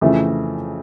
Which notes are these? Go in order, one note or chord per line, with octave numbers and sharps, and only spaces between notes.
F2 C#3 E3 A3